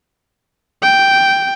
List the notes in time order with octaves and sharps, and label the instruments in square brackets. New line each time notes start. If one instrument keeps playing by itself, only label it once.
[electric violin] G5